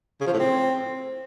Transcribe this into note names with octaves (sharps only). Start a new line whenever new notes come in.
C#3
F3
A2
C4